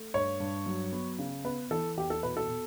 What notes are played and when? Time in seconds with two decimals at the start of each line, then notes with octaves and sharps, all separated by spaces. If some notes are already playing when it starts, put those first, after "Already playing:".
Already playing: A3
0.14 G2 C#5
0.40 G2
0.66 F#3
0.92 B3
1.19 C#3
1.45 B3 B4
1.71 E3 A4
1.97 E2 G4
2.10 A4
2.23 B2 B4
2.37 A4
2.49 B2